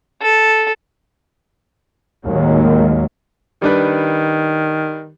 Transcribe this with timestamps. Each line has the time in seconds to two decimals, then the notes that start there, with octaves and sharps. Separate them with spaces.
0.22 A4
2.24 D#2 A2 D#3 F#3 G#3 A#3
3.62 D#3 G3 D4 B4